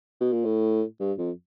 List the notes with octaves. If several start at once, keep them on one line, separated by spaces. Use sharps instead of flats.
B2
A#2
A2
G2
F2